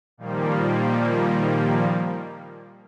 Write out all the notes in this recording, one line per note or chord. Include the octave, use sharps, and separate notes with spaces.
A#2 D#3 F3 G3 A#3